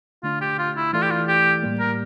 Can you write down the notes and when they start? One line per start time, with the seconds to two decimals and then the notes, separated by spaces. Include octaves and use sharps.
0.23 D3 A3 D4 F4
0.41 G4
0.58 F4
0.76 E4
0.93 E3 A3 E4 F4 A4 D5
1.02 G4
1.11 F4
1.28 G4
1.63 A2 G3 A#3
1.80 A#4